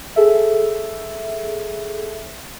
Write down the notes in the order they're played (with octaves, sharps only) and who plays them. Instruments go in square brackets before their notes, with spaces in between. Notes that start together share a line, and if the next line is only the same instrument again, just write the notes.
[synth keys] G#4 A4 E5